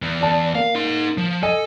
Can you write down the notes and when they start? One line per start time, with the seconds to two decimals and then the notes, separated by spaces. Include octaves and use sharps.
0.02 E2
0.21 D5 A5
0.55 A#3 F5
0.75 D#4 C6
1.17 F3
1.43 A4 D#5 G#5 D#7